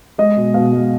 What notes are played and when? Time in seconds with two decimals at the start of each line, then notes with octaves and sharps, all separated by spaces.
0.18 G#3 D#5
0.37 B2
0.54 B2 F5
0.72 G#3